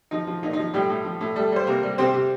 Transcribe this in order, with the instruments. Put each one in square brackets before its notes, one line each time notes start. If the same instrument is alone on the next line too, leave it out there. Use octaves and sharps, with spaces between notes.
[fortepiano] F3 D#4
F3
A#2 D#4
D#4
F3
A2 G3 G4
A2
F3
A2
G3 A3 A4
G3 C5
C3 A#3 A#4
G3
C3 C4 C5
C3